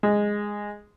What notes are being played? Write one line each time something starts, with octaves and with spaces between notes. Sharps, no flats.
G#3